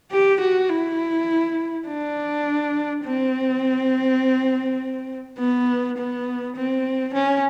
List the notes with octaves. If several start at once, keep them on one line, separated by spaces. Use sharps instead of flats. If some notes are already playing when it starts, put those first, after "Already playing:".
G4
F#4
E4
D4
C4
B3
B3
C4
C#4